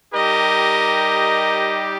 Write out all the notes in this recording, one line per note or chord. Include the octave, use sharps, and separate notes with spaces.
G3 D#4 G4 A#4 D#5